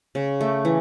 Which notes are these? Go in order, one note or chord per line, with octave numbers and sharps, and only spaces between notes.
C#3
A3
E3